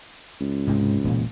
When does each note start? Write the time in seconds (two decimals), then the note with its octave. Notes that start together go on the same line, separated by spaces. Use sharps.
0.40 C#2
0.67 G#2 C3 G#3
1.04 E1 A#2